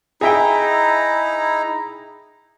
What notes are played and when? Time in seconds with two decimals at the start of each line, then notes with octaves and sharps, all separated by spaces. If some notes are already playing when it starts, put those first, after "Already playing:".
0.21 D#4 E4 G#4 E5 G5 A#5